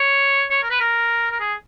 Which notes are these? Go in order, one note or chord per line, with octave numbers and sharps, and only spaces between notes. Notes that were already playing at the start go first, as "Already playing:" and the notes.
Already playing: C#5
C#5
A#4
B4
A#4
A#4
G#4